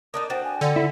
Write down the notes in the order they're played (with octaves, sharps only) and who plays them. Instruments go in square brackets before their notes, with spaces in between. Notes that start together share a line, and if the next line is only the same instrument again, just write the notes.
[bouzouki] A#3 D4 D#4 [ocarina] D#6
[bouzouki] D4 F#4 G5 [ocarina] C5
[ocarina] G#5
[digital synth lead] D3 [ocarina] D5
[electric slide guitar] E4